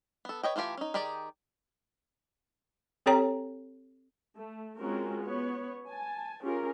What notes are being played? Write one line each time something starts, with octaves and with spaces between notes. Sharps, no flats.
B3 A4
B4 C#5 D#5 G5
E3 A3 F4 G4 G#5
C#4 D#4
D#3 D#4 G4 G#4 D5
C4 G4 A4 C#5 G5 A#5
A3
G#3 C4 C#4 F4 F#4 A#4
B3 C#5
G#5 A5
C#4 F4 G4 G#4 A#4